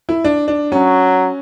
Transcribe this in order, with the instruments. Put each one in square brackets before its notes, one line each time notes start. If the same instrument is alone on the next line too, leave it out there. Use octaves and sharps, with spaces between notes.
[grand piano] E4
D4
D4
[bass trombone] F#3 [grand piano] C#4